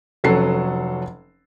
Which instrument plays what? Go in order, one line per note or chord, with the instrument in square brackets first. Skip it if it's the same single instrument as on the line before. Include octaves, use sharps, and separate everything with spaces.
[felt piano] F1 F#3 C#4 A4 F#5 C7